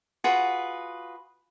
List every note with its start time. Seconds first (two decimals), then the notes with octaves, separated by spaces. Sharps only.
0.24 F4 F#4 G#4 B4